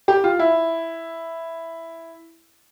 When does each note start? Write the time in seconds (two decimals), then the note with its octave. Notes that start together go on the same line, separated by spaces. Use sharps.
0.08 G4
0.24 F4
0.39 E4